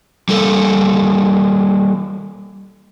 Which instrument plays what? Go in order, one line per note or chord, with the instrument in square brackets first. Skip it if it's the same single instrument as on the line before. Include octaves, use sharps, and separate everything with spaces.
[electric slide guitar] G3 A#3 A4